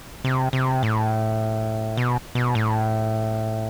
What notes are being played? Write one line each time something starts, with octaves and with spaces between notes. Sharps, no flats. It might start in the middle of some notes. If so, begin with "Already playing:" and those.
C3
C3
A2
B2
B2
A2